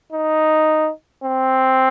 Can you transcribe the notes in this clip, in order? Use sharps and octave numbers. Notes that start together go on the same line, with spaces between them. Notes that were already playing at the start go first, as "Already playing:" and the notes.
D#4
C4